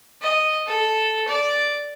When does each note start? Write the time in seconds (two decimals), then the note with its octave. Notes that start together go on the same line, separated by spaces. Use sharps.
0.22 D#5
0.67 A4
1.28 D5